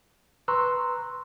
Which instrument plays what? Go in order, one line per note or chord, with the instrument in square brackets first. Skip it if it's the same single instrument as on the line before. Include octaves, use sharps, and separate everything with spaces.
[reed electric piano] B4 A#5 C6 C#6 E6 F#6